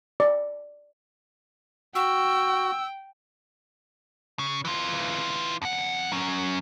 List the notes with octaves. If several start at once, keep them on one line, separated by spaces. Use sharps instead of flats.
D5
F#4 G5 E6
C#3
E3 F4
F2 F#5
F#3 C#4